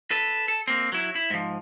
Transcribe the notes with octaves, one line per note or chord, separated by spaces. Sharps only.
A4 B4
A4
A#3 C4
F#3 E4
E4
G#2 F3